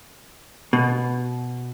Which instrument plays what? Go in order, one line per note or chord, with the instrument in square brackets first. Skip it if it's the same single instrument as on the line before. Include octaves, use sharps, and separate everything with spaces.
[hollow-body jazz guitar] B2